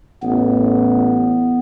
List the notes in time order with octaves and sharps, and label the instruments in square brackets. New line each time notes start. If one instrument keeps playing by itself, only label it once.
[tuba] A1 [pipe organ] B3